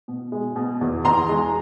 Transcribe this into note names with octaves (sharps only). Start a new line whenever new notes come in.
B2
G#3
B2
E2
E2 A#5 C6
G#3